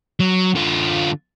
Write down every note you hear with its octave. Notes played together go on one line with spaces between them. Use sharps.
F#3
D3 F4